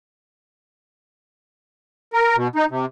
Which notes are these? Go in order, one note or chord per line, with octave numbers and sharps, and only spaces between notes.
A#4
B2
D#4
C3